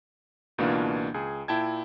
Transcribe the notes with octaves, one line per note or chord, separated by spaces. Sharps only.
C#2 B2 E3 A#3 D4 F4
C#2 G#4
A#2 E4 G5 A5 G#6